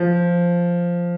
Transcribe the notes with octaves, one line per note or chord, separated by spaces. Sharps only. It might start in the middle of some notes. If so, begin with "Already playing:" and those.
Already playing: F3